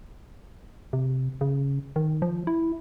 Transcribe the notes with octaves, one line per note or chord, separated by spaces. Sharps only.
C3
C#3
D#3
F3
E4